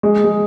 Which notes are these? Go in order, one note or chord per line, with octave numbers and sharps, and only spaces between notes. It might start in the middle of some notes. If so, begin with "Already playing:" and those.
G#3
G#3